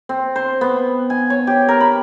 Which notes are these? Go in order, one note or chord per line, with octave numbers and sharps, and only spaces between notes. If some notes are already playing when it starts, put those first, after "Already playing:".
C4
C5
B3
G#5
C#5
G4
A#4
B5